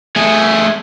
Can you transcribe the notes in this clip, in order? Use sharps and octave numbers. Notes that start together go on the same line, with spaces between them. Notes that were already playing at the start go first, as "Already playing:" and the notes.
A3 G#4